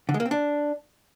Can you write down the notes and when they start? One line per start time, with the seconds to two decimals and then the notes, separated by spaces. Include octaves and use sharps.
0.09 D3
0.14 G#3
0.20 A#3
0.25 C4
0.31 D4